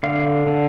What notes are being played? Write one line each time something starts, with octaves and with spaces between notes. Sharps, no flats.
D3 F5
D3